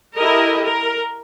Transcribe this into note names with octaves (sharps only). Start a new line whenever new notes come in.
E4 G4 A4 A#4 D#5
A#4